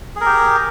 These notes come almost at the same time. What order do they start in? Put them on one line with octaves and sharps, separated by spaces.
G#4 A#4 G4